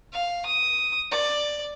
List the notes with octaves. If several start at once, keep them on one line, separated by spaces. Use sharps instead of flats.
F5
D#6
D5